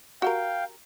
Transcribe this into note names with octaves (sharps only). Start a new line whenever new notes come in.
F#4 G4 A#4 F5 G5